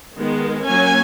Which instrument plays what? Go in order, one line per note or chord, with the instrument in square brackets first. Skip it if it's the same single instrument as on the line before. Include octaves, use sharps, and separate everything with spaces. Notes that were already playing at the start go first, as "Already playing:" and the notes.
[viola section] D#3 G#3 B3
F#3 A#3 C#4 G#5